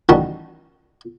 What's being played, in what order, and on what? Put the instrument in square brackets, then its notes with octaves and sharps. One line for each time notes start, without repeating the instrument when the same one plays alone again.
[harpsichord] A1 D#3 G3 F#4 A5